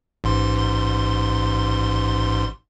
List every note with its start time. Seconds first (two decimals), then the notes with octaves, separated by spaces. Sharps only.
0.24 A1 G#2 C6